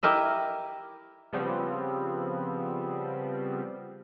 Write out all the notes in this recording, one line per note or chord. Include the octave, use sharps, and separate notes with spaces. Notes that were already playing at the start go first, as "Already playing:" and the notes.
E4 G4 A#4 D#5 E5
C#3 F3 G3 B3 C4